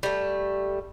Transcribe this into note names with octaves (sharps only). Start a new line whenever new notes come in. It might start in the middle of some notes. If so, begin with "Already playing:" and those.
G3 A3